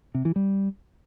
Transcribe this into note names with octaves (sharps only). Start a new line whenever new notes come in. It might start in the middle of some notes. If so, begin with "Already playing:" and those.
C3
E3
G3